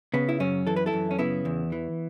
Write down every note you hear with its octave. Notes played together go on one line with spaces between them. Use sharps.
C#3 B3
E4
F#2 C#4
E3 A4
B4
E4 A4
F#2
C#4
C#3 B3 E4
E2
E3